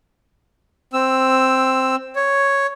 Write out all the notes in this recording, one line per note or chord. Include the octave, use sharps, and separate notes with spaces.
C4 E6
C#5